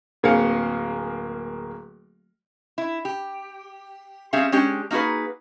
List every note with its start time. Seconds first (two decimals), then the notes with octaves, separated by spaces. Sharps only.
0.23 D1 A#3 C4 G#4 F5 C#7
2.78 E4
3.05 G4
4.33 G3 C4 C#4 G#4 E5 F5
4.52 G#3 C#4 D4 G4
4.91 A#3 D#4 F#4 G#4 B4